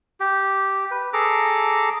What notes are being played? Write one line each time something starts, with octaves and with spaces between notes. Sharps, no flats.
G4
B4
G#4 A4 A#5 D6